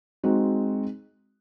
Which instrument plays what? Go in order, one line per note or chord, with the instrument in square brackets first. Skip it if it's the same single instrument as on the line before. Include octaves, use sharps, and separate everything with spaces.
[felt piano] G#3 C4 D#4 F#4